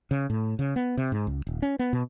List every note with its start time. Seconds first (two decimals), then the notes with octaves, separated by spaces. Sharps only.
0.11 C#3
0.30 A2
0.59 C#3
0.76 B3
0.97 C3
1.12 G#2
1.27 C#2
1.47 D#1
1.62 C#4
1.79 B3
1.93 B2